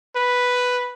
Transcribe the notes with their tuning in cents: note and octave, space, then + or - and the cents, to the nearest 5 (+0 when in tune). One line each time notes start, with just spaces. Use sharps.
B4 +0